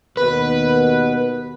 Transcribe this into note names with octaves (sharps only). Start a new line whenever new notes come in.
D#2 B2 B3 B4